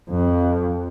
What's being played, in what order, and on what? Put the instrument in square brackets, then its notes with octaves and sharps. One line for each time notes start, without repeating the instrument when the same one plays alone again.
[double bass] F2